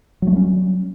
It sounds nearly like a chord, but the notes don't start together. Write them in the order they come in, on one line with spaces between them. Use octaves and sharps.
F#3 A3 G3 C#4